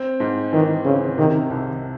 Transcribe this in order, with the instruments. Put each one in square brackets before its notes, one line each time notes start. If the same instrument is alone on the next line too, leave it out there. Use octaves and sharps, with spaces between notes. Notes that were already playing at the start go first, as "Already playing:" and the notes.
Already playing: [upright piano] C4
G#2
[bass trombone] D#3 [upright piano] E3
[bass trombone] C#3 [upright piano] C4
[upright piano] C3 [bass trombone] D#3
[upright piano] C2